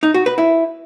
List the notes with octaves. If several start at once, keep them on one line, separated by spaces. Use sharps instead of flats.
D#4
F#4
B4
E4